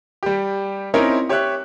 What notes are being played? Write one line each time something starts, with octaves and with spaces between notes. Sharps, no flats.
G3 G4
C4 C#4 D#4 E4 A#4 C#5
G4 C#5 E5 C#6 F#6